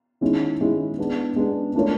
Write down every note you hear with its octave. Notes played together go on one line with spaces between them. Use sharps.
D#3 G#3 C#4 E4
D#3 G#3 C#4 E4
G#3 B3 D4
G#3 B3 D4
A3 D4 F4 A#4 C#5